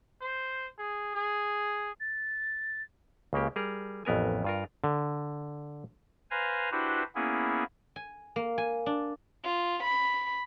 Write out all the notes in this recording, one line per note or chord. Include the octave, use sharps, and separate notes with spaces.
C5
G#4
G#4
A6
C#2 C#3 A#3 G4
G3 G#4 A#4
A1 F2 B3 A#4 G#5
G2 F4 A#4
D3
B4 C5 F5 G#5 A#5
D4 E4 F#4 G4 B4 C5
A#3 B3 C#4 E4 G#4
G#5
A#3
G#5
D4
F4
B5